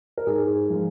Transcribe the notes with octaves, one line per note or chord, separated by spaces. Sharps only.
A#4
G#2 G#4
F3 G#3